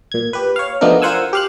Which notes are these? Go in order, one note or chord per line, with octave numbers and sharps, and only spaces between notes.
A#2 G#6
G4 B4
C#5 F5
F3 A3 B3 D4 D#4 A#4
F4 A#4 C5 F#5 G#5 E6
G4 F5 F#6